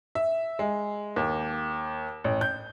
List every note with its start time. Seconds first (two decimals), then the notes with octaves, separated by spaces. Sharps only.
0.15 E5
0.59 G#3
1.16 D#2
2.24 A1
2.41 G6